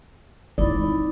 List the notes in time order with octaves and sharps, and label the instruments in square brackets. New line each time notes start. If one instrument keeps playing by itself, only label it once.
[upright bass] G#3 C4 [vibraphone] D#4 E4 B5 [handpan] D5